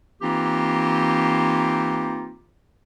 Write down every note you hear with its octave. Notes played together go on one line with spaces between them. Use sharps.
E3 A#3 C4 D#4 F4 G4